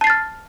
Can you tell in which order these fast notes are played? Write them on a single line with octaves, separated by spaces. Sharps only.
A5 C7 A6 F6